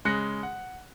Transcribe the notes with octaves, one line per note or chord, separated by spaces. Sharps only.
C#3 G#3 F#6 A#6 C#7
F#5